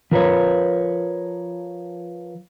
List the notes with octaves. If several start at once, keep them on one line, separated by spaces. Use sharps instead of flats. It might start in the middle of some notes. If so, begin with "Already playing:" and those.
F3 A#4 B4 C#5